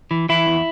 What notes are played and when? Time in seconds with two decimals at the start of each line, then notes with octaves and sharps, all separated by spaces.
0.11 E3
0.29 E3 E4
0.46 E2